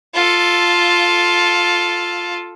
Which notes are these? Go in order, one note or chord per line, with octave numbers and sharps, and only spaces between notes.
F4 A4